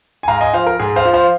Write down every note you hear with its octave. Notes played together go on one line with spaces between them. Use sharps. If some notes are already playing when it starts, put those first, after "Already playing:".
G#5
G#2 F5 A#5
D#5 G#5
F3 C5 F5
A#4
G#2 G#4
C5 F5
F3
C5 F5